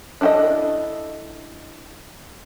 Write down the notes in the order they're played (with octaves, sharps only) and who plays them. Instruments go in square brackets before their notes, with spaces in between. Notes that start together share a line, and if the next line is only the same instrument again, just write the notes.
[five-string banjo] D4 E4 F#4 A4 D#5